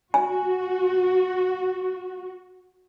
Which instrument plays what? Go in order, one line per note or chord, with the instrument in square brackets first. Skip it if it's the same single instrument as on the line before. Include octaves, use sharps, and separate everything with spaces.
[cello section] F#4 [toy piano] G#5